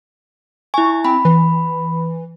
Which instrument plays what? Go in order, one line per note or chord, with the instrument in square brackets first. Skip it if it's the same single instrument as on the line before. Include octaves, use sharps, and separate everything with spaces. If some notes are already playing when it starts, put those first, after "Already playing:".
[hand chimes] E4 G#5 [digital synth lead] C#6
[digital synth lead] C4 [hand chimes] B5
[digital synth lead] E3